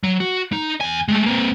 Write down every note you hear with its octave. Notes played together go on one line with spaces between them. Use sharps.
F#3
F#4
D#4
E2 G#5
G#3 A3
A#3 C4